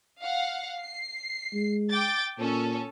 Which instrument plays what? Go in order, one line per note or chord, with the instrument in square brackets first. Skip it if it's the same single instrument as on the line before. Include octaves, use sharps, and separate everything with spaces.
[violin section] F5 F#5
C7
[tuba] G#3
[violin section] G5 D6 A6
[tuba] A#2 [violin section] C#4 A4